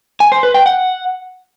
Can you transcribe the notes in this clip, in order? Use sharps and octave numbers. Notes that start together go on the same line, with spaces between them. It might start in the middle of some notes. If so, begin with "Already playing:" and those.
G#5
C5
B4
G5
F#5